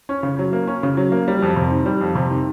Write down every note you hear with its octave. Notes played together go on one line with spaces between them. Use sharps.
C#4
C#3
F#3
A#3
C#4
C#3
F#3
A#3
G3
F2
C3
D#3
G3
F2
C3
D#3